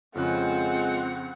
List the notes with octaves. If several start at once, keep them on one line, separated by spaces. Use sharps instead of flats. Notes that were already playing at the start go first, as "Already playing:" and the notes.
F2 C#3 G#3 C4 F4 F#5 F#6